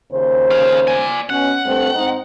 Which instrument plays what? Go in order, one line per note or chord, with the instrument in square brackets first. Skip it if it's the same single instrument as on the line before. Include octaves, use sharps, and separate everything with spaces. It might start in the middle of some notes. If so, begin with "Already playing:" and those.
[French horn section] D#2 C#3 C5
[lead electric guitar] G#4 F5
D5 G#5
[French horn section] B2 C#4 [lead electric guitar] F#5
[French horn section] G2 A3 C4
G#2 C4 D#4